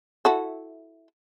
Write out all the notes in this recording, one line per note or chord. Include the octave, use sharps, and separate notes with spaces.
E4 F#4 A4